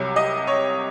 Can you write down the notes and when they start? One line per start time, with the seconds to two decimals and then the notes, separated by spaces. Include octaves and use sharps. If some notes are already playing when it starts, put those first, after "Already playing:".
Already playing: C2 C3 F#3
0.16 D#5
0.47 C#5